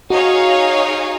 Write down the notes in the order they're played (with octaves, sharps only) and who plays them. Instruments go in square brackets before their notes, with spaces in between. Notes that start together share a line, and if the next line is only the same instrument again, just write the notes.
[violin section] D#4 G#4 C#5 F5 [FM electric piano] F#4